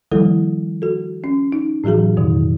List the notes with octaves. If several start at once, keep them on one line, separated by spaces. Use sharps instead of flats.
D#3 F3 G3 A#3 E4 A4
F#4 A4
C#4
D#4
A2 E3 F#3 F#4 G#4
F2 B2 D#3